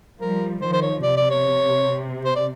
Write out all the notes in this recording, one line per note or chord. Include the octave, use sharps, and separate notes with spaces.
F3 G3 A#4
D#3 F3 C5
C5
C#5
C3 D5
D5
C#5
C5
D5